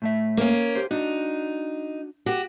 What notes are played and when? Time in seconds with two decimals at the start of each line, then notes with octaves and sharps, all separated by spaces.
0.02 A2 A3 E5
0.37 A#3 C#4
0.75 G4 C5
0.91 D4 D#4 F#4
2.26 F#4 G4